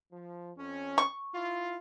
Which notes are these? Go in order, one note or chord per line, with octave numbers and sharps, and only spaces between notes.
F3
F2 C#4
C#6
E4 F4